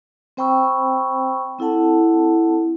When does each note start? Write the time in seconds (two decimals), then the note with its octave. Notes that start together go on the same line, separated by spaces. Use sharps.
0.37 C4 C5 G5 B5 C#6 E6
1.59 C4 E4 A4 F#5 A5